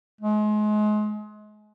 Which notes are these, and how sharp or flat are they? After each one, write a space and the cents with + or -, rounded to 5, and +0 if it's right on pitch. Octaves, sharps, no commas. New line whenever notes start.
G#3 +30